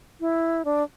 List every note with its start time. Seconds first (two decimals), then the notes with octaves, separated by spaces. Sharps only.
0.20 E4
0.65 D4